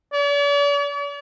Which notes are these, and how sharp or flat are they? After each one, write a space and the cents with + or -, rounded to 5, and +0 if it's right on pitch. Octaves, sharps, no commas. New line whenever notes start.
D5 -45